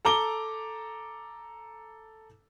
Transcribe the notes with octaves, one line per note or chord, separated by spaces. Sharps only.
A4 A#5 D6 G7